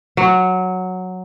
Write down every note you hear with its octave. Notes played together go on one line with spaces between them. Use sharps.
F#3